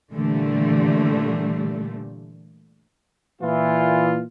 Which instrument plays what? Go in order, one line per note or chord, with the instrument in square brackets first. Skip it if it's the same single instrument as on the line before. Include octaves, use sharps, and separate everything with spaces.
[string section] A#2 D3 E3 G3 A3
[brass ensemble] A#2 E3 F4